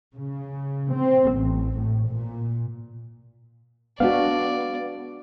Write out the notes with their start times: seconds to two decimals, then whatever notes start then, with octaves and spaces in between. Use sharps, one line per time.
0.15 C#3
0.93 C4
1.32 A1
1.78 A2
2.09 A#2
4.00 G#3 B3 D4 F#4 D5 F5